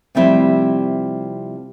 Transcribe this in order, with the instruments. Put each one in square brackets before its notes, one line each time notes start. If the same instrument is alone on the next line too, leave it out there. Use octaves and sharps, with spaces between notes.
[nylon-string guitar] C3 F3 G3 A3 C4 E4